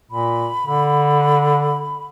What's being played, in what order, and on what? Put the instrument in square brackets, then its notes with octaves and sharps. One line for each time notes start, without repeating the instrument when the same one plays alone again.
[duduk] A#2 [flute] B5
[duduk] D3